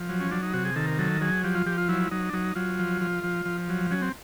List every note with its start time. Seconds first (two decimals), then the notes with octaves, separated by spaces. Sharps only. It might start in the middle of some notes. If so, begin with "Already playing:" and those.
Already playing: F3
0.09 F#3
0.20 C#4
0.31 F#3 D4
0.43 D#4
0.54 C3 F#4
0.65 G#4
0.76 D#3 A4
0.87 A#4
0.99 F#3 A4
1.21 F#3 G#4
1.44 F3 G4
1.55 F4
1.66 F3 G4
1.78 F4
1.89 F#3 E4
2.11 F#3 D#4
2.29 D4
2.33 F#3 D#4
2.56 F#3 F4
2.79 F3
3.01 F3
3.24 F3
3.45 F3
3.69 F#3
3.91 F#3 C#4
4.02 C4